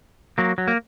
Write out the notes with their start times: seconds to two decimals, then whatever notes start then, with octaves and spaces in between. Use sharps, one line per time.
0.38 F#3 A#3
0.58 F#3
0.68 A#3